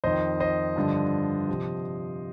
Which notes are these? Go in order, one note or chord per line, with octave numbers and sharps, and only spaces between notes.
F2 D#3 C5 D#5
C5 D#5
G2 D3 F3
C3 F3